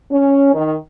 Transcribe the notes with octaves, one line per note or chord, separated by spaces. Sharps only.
C#4
D#3